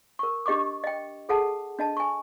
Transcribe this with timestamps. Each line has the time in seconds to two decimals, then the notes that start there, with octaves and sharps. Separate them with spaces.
0.19 A#4 C#6
0.46 D4 G4 D#5 C#6 D6
0.84 D#5 G5
1.29 G#4 A4 F#5 A5
1.79 D4 D#5 A5
1.97 G#5 C#6